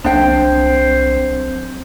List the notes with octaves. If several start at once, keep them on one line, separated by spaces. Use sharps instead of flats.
C2 F#3 C4 D4 C5 G5